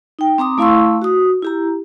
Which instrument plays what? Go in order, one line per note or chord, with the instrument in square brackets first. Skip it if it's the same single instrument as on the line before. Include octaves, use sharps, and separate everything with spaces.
[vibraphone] D#4 G5
C4 A#5 D6 D#6
A3 E4 F5 C6 C#6 E6
F#4 D#6
E4 G4 A#5